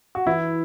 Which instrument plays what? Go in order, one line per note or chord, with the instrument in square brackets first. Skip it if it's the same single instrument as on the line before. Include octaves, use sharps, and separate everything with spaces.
[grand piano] F#4
[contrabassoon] E3 [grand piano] E4